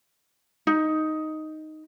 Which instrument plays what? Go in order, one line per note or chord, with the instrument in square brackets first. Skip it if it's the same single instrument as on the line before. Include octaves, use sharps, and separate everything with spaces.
[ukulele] D#4